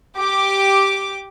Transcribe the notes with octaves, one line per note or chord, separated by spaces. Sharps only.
G4 D6